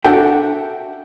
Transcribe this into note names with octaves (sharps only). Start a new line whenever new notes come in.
D4 F#4 A4 E5 F#5 G5